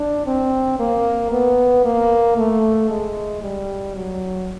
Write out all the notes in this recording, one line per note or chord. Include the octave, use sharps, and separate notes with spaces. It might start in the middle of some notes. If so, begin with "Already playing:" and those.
Already playing: D4
C4
A#3
B3
A#3
A3
G#3
G3
F#3